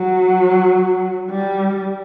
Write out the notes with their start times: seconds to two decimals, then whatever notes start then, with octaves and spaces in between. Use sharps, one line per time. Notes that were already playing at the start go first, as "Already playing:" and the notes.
Already playing: F#3
1.30 G3